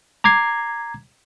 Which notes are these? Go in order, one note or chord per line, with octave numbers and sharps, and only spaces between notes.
A#5 D6 G#6 C7